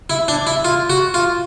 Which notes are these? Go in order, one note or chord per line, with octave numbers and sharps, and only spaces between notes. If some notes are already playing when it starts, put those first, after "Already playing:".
E4
D4
E4
F4
F#4
F4